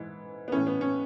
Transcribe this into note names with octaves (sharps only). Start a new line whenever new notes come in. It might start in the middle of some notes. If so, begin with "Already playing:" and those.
Already playing: G#2 E3
B3
A2 E3 C#4
B3
C#4